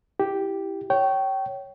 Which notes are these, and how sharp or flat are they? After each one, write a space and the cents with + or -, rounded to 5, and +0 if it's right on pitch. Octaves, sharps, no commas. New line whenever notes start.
E4 +0 G4 +0
C#5 +0 G5 -25